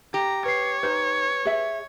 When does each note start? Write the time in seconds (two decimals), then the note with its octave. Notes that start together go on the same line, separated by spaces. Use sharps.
0.14 G4 A#5
0.45 B4 C#5 C7
0.83 D#4 B4 C5
1.45 G#4 E5